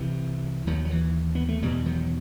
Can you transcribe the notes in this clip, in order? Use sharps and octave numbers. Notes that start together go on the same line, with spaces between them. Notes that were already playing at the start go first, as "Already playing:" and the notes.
Already playing: C2 C3 E3
D#2 D#3 F#3
F#3
E3
B3
A3
E2 B2 E3 G3
D#3 F#3